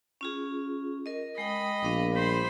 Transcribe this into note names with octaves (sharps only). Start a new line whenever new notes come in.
C#4 F4 G#4
A#4 D#5
G#3 D#5 G5 B5 D#6
A#1 B3 F5 D6
G3 C5 B5 C6